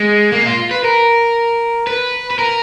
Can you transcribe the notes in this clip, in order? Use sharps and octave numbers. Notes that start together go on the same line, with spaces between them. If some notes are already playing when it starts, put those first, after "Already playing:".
Already playing: G#3
A#3
F4
B4
A#4
B4
B4
A#4